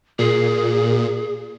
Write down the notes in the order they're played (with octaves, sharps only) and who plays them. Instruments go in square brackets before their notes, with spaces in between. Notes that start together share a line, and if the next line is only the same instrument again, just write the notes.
[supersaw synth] A#2 [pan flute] G#4